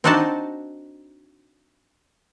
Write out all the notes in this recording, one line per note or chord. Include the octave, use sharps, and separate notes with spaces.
C4 D4 D#4 F#4 C5 A5